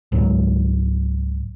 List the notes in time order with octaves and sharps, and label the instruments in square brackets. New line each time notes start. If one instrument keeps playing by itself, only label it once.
[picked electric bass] C#2 G#2 F#3